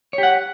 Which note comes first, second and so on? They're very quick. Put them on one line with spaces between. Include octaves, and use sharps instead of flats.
C#5 G4 F#5